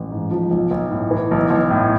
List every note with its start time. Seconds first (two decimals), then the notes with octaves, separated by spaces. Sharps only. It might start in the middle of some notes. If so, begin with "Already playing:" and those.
Already playing: A1
0.11 G#2
0.31 F3
0.51 B1
0.71 B1
0.91 A2
1.11 E3
1.31 B1
1.50 B1
1.70 A2